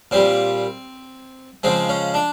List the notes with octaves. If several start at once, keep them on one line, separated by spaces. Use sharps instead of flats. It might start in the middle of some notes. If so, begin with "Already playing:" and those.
A#2 G3 C4
C#3 F3 G#3 C4
C#4
D4